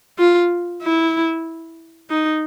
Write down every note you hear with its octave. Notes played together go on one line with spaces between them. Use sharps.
F4
E4
D#4